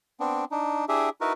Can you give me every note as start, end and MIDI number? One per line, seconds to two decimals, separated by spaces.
0.20 0.45 59
0.20 0.45 60
0.20 0.45 62
0.51 0.85 62
0.51 0.85 63
0.89 1.09 62
0.89 1.09 64
0.89 1.09 67
0.89 1.09 68
0.89 1.09 76
1.21 1.33 63
1.21 1.33 64
1.21 1.33 66
1.21 1.33 70
1.21 1.33 71